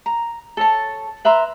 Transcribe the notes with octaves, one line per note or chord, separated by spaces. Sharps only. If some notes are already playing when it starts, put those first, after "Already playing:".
A#5
A4 C#5 A5
B4 E5 A#5 C6